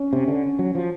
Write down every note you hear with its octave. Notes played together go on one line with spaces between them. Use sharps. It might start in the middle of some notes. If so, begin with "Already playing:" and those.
Already playing: C#4
C3
D3
F#3
F3